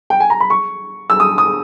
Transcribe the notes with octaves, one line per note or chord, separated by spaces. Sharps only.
G5
G#5
A#5
B5
C#6
E6
D#6
D#6